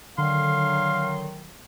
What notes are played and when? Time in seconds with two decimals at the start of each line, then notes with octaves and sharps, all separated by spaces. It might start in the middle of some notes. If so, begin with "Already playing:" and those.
0.18 D3 D#3 F#3 F5 C6